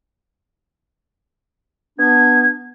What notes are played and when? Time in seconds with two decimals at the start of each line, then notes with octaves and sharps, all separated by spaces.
1.99 B3 D4 G#6